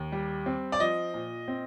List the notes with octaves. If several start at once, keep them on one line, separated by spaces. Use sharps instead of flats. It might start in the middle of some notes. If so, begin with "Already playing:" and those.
Already playing: D#2
G3
C4
D5
F3 D#5
A#2
C4